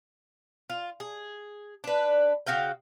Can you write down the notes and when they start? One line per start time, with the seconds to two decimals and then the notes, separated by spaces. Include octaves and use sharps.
0.70 F4
1.00 G#4
1.84 D4 B4
2.46 C#3 F#4 F5 G5